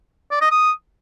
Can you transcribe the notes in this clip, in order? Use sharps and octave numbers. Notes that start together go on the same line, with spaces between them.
D5
D#5
D#6